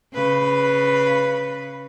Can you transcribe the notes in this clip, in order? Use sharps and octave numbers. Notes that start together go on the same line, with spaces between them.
C#3 B4